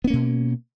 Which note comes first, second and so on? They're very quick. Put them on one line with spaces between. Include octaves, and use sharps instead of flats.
B3 C#4 A#3 B2